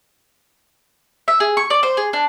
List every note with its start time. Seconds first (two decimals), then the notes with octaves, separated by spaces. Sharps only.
1.28 E5
1.40 G#4
1.57 C#6
1.70 D5
1.83 C5
1.97 G#4
2.13 D4